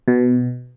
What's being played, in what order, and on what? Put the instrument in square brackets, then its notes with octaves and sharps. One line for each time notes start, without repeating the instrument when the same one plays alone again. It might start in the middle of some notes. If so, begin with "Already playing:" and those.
[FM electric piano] B2